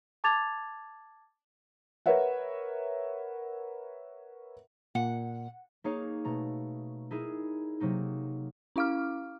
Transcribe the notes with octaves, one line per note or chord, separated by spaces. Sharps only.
A5 D6 G#6 A6 F7
A#4 B4 C#5 E5 F#5
A#2 F#5
A#3 D#4 G#4 C#5 F5
B2 A3 A#5
D#4 E4 G#4 A#4
C3 F#3 A#3 D#4
C#4 E4 F5 D6 F6